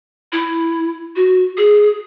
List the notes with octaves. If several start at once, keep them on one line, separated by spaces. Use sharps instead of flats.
E4
F#4
G#4